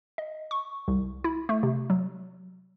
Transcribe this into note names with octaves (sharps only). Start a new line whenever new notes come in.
D#5
C#6
C2
E4
A3
C3
F#3